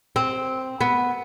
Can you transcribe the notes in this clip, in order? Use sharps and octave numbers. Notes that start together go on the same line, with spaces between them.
C4
B3